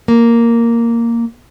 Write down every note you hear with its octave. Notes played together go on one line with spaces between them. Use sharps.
A#3